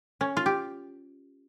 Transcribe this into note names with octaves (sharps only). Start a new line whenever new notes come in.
C#4
F4
G4